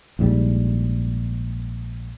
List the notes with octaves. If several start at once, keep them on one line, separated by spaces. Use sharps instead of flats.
A#1 G#2 F3 G3